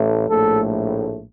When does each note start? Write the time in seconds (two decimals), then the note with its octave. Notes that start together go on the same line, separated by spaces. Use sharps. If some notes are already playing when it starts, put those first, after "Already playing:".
Already playing: A1 A2 A3
0.29 A#1 A2 A3 A4